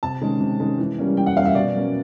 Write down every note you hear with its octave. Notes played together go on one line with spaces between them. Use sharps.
C3 A5
D#3 G#3 C#4
C3
D#3 G#3 C#4
E3
G3 A#3 C#4
E3 G5
F#5
G3 A#3 C#4 F5
E5
B2 D5
F#3 A#3 C#4